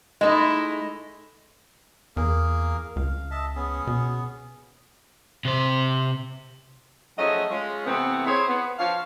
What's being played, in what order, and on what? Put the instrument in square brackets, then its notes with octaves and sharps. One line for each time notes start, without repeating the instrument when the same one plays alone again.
[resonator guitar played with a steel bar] G#3 A3 [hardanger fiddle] D#4 E4 [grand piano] D#5
[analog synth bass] E2 [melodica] A#3 G#4 A#4
[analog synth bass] C#2 [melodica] F5
[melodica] D#5 E5 A5
B3 C#4 G#4
[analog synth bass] B2
[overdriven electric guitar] C3 C5
[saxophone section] F3 F#3 A3 C#4 G#4 D#5
G#3 C#4 F4
C3 E3 A3 B3 C4
C4 E4 G#4 C5 C#5
B3
F3 D4 C#5 F5